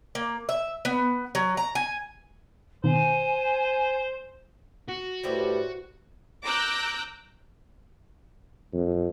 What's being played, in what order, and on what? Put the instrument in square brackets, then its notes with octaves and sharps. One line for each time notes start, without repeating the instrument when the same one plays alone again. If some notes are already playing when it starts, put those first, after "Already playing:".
[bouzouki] A#3
E5
B3
F#3
A#5
G#5
[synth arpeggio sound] B2 D#3 [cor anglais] C5 [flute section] G#5
[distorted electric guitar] F#4
[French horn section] A2 B4 C5 [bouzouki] G3 E4 G4
[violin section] A#5 D6 E6 F#6 G6
[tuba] F2